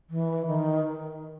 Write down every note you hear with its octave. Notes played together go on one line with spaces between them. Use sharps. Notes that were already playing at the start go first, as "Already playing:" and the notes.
E3
D#3